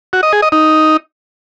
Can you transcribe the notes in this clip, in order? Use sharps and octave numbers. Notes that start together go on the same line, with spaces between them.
F#4
D#5
G#4
D#5
D#4